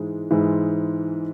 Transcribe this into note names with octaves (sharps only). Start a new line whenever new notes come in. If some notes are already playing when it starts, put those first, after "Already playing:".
Already playing: G#2 E3 G#3
G#2 E3 G#3